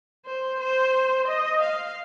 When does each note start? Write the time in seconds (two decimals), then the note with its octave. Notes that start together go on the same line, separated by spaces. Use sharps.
0.25 C5
0.60 C5
1.28 D#5
1.61 F5